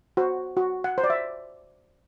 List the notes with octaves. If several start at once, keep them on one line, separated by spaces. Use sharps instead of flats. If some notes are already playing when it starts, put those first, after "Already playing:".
F#4 C5
F#4
F#5
C5
D5
E5